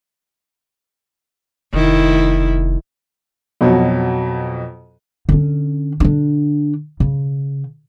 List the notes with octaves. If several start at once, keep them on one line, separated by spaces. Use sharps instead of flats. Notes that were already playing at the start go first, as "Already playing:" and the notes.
F1 D#3 E4
F2 B2 F#3
D3 C#4
D3 D4
C#3